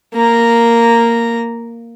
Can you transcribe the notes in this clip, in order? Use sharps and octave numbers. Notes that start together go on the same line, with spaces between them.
A#3 A#5